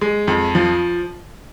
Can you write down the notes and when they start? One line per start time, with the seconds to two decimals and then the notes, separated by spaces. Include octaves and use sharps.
0.01 G#3
0.28 F2
0.55 F3